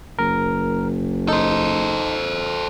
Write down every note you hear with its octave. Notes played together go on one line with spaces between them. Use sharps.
F#1 A#4
D#4 A4 C5